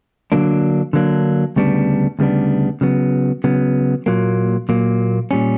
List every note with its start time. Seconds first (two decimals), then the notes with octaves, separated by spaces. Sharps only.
0.32 D3 F#3 A#3 D4
0.93 D3 F#3 A#3 D4
1.56 D2 C#3 G3 B3 D4
2.19 D2 C#3 G3 B3 D4
2.81 C#3 F#3 B3
3.44 C#3 F#3 B3
4.06 A#2 F#3 A#3
4.69 A#2 F#3 A#3
5.31 A#2 G3 C#4